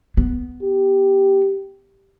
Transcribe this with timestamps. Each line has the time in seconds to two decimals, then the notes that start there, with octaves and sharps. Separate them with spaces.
0.17 B3
0.63 G4